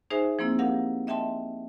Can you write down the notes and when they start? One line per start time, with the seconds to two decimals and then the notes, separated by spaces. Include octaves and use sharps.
0.10 D#4 G#4 C5 E5 G#5
0.39 F3 A#3 C4 E4
0.59 G4 A#4 F5 F#5
1.07 D#5 E5 G5 A5 C6